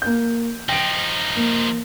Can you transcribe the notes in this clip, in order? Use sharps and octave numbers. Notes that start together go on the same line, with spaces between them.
A#3 G6
F3 D#4 G5 D7
A#3